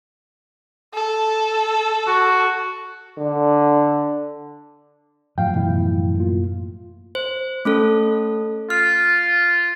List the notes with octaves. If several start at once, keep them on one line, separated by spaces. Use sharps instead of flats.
A4
F#4
D3
F#2 A2 F3 F5 G5
B2 E3 E4
A#3 F4
C5
A3 C#4 A4
F4 F6